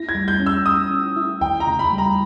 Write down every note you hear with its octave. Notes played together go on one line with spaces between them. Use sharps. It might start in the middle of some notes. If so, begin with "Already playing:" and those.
Already playing: E4 A#6
G#6
G3
G6
C#4
E6
C#4 D#6
C#4
E4
D#2 G5
A#5
C#3
B5
G3
A#5